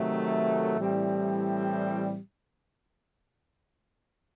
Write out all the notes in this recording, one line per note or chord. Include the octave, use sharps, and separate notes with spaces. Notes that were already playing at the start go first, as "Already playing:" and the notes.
Already playing: C3 D#3 F#3 A3
A2 E3 G3 C4